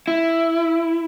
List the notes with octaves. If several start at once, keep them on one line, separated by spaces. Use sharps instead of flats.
E4